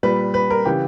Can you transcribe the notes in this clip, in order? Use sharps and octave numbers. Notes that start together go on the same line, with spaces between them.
A#2 G3 B4
B4
A#4
C#3 E3 G4